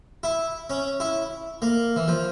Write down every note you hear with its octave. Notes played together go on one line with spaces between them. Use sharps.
E4
C#4
E4
A#3
E3
F3